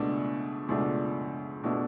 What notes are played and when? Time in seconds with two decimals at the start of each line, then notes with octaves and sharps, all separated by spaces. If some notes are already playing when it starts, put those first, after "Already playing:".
Already playing: C#2 B2 A3 D4
0.68 C#2 B2 A3 D4
1.64 B2 A3 D4